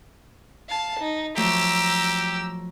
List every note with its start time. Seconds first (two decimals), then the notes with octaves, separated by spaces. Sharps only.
0.69 F5 A5
1.00 D#4
1.37 F3 F#3 A3 G4 A#5 E6